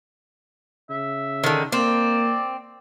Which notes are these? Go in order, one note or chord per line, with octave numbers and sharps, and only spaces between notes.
C#3 E5
D3 D#3
A#3 C4 D5